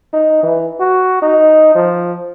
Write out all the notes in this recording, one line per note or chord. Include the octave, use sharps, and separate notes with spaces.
D#4
E3
F#4
D#4
F3